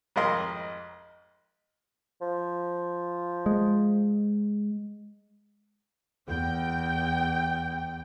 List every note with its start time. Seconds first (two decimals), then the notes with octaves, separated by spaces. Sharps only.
0.16 G#1 F2 A#4 D#5 C6
2.21 F3
3.46 G#3
6.29 E2 G5